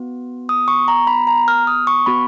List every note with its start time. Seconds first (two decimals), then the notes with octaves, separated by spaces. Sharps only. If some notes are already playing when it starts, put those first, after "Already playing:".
Already playing: B3 F#4
0.49 D#6
0.68 C#6
0.88 A#5
1.07 B5
1.27 A#5
1.48 F6
1.67 D#6
1.87 C#6
2.06 B3 F#4 B5